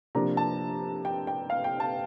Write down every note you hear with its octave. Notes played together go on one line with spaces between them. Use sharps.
C3 F3 A#3 D4 A#5
A5
G5
G5
F5
G5
A5